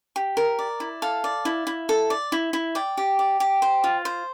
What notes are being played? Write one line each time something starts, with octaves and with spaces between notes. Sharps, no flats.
G4
A#4
D5
E4
A4 F5
D5
E4
E4
A4
D5
E4
E4
D5 G5
G4
D5
G4
C5
F4
C5